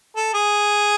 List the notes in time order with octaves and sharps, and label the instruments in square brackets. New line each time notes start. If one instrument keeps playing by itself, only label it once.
[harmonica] A4
G#4